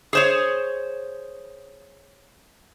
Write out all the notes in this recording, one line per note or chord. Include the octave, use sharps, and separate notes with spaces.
G#4 C5 C#5